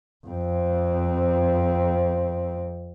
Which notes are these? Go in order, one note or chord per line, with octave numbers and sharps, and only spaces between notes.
F2 C4